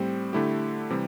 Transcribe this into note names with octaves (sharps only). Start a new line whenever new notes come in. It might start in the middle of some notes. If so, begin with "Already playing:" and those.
Already playing: A2 G3 C4
D3 A3 E4 G4
C3 E3 G3